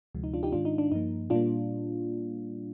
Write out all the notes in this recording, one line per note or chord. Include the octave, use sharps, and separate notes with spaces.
D2 C3 F3 G#3
D#4
D4 F4
D#4 G4
G#2 D#3 G#3 D4 F4
D#4
D4
G2 F3 A#3 D#4
A#2 G3 A#3 D4 F4